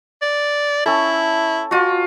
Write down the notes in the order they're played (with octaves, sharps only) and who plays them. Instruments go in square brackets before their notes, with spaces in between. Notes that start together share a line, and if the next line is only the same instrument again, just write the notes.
[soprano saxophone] D5
[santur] C#4 A4 [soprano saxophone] E4
[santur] F4 F#4